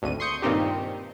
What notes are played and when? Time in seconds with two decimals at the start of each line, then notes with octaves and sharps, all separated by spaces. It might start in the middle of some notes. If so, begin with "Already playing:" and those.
0.02 G#1 D2 D#7
0.20 C6 C#6 D#6 G6 C#7
0.42 G2 A#2 D#3 C4 D#4 G4